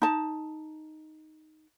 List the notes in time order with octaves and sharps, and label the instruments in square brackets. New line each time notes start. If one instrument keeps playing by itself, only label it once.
[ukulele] D#4 A5